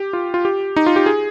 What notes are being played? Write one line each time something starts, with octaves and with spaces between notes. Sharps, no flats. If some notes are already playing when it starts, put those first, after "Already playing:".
Already playing: G4
F4
F4
G4
D#4
F4
G4
G#4